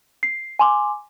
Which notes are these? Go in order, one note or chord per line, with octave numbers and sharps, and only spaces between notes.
C7
G#5 C6 D6